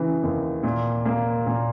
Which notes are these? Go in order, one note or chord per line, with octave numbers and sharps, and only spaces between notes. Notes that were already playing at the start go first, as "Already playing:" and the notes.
Already playing: C#3 E3
D#2
A#2
A#3
A#2